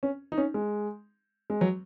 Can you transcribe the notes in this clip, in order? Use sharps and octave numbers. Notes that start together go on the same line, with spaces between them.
C#4
D#4
C#4
G#3
G#3
F#3